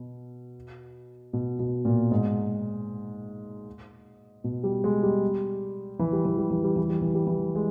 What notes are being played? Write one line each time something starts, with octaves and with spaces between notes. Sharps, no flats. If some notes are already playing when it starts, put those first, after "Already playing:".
Already playing: B2
B2
B2
A#2
G#2
B2
G3
G#3
G3
E3
G3
E3
G3
E3
G3
E3
G3
E3
G3
E3
G#3